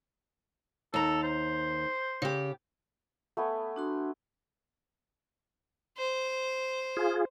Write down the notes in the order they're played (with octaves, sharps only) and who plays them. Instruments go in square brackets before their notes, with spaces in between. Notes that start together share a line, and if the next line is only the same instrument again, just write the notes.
[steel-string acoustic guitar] D#2 A#5 [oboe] A4
[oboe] C5
[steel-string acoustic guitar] C#3 G4
[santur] A3 B3 G#5
[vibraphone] D4 F#4 C6
[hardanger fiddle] C5
[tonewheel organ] F4 G#4